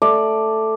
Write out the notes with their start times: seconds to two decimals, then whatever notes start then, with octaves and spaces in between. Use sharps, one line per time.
0.02 A3 D5